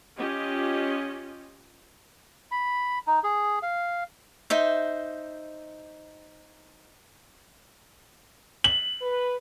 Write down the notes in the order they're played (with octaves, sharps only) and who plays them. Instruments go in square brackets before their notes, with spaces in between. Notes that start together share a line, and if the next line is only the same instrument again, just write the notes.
[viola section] C#4 F4 G4 D#5
[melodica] B5
D#4
G#4
F5
[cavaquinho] D#4 C5 E5
[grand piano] F#7
[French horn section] B4